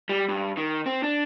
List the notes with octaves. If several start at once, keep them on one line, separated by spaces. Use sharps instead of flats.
G3
G2
D#3
C4
D4